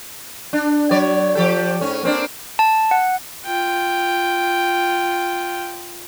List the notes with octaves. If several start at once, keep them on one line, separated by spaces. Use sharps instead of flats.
D4
F#3 C#5 D5
F3 G4 A4
G#2 C#4
A#3 C4 D4
A5
F#5
F4 G5